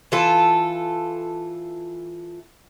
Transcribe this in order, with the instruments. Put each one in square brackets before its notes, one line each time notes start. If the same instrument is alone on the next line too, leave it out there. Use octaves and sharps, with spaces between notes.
[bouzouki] E3 F4 A4